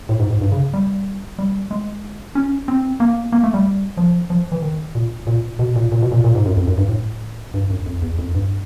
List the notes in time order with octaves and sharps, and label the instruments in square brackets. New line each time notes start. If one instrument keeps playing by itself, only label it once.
[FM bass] A2
G#2
G#2
G2
C#3
G3
G3
G#3
C#4
C4
A#3
A#3
A3
G3
F3
F3
E3
D#3
A#2
A#2
B2
A#2
A#2
B2
A#2
A#2
G#2
F#2
F2
F#2
G2
A2
G2
F#2
F2
E2
F2
G2